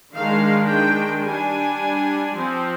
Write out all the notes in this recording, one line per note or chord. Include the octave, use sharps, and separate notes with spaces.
D#3 G#3 D4 F5
G5
G3 D4 G#5
F3 C4